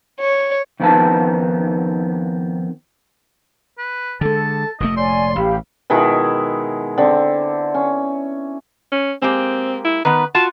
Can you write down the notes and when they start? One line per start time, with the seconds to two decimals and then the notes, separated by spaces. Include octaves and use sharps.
0.20 C#5
0.80 F2 D#3 B3 C4 D#4 A5
3.78 B4
4.21 D3 G#3 A4 A5
4.80 F1 A#2 A3 D#5
4.97 C#5 D5 G#5 C6
5.36 A1 G4 F5 B5
5.90 B2 D#3 G#3 E4
6.98 D3 C4
7.74 C#4
8.92 C#4
9.22 G#3 A#3 C4 G4
9.85 E4
10.05 D#3 B3 B4
10.35 F4 F#4 A5